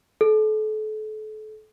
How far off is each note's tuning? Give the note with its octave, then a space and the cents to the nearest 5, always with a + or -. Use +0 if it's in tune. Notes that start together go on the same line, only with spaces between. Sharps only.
A4 -35